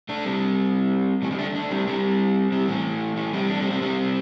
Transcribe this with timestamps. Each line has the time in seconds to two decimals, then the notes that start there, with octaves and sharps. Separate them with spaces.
0.09 A3 D4
0.25 G3 C4
1.22 E3 A3
1.31 D3 G3
1.39 A3 D4
1.55 A3 D4
1.71 G3 C4
1.87 G3 C4
2.52 G3 C4
2.68 E3 A3
3.16 E3 A3
3.33 G3 C4
3.49 A3 D4
3.60 G3 C4
3.71 G3 C4
3.81 G3 C4